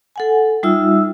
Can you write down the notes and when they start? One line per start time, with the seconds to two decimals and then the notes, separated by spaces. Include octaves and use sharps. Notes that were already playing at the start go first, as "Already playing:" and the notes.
0.16 A4 F#5 G#5
0.63 G3 D#4 F4 E5 E6